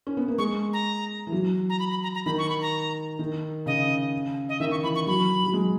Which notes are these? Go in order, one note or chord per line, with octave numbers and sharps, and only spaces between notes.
C#4
B3
A#3
G#3 C#6
A#5
E3
F#3
A#5
B5
B5
A#5
A#5
D#3 B5
C#6
B5
A#5
D#3
C#3 D#5
D#5
D#3 E5
C#6
E3 B5
C#6
F#3 B5
F#3
G#3